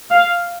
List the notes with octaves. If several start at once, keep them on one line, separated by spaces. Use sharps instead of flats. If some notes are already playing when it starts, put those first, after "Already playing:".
F5